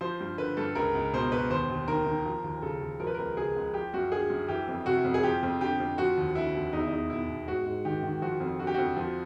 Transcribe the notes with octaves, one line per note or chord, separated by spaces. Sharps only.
F3 C5
G2
D3 B4
G2 A4
C#2 A#4
C#2
B2 C5
B2 B4
D#2 C5
D#2
D#3 A#4
D#3
F3
D#2
C#3 A4
D#2
F3 A#4
B4
C#2 A#4
C#3 G#4
C#2
F3 G4
F#2 F#4
D3 G#4
F#2
E3 G4
F2
C3 F#4
F2
G#4
F3 G4
F2
D3 G4
F2
F3 F#4
D#2
D3 E4
D#2
E2 D#4
E4
E2 D#4
B2 E4
B2
G#2 F#4
G#2
D#3 G4
D#3
F3 F#4
F2
D3 F#4
G4
F2 F#4
F3